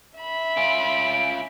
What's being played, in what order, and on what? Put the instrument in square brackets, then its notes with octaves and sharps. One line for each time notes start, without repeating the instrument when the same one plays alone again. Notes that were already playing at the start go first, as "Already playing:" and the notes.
[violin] E5 B5
[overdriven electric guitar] C#4 F4 [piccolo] D7